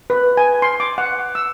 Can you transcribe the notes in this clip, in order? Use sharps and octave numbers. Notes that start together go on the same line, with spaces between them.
B4
G#5
C6
D6
F#5
E6